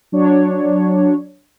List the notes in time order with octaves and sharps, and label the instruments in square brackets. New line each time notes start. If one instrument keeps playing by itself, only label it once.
[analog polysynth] F#3 D4 C#5